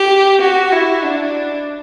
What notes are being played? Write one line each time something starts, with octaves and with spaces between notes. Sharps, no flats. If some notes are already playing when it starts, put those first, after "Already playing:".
Already playing: G4
F#4
E4
D4